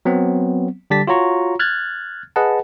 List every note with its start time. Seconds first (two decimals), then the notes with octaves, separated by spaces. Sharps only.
0.05 F#3 B3 C4
0.90 D3 G3 G4 A5 A6 B6
1.07 F4 F#4 C#5 A#5 C#6
1.59 F6 F#6 G#6 A6
2.36 G#4 B4 D#5 F#5 A5